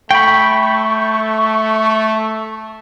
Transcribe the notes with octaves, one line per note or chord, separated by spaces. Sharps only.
A3 G5 B5 C#6